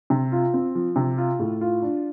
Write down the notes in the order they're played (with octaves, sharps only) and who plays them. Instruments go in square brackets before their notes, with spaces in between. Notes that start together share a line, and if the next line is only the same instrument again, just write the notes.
[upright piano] C3
F4
C4
F3
C3
F4
A2
F4
D4